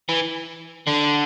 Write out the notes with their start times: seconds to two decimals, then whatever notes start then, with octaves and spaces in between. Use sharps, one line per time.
0.09 E3
0.87 D3